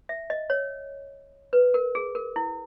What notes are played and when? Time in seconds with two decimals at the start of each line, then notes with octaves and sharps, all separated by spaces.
0.09 E5
0.30 D#5
0.50 C#5
1.53 B4
1.74 A#4
1.95 G#4
2.15 A#4
2.36 E4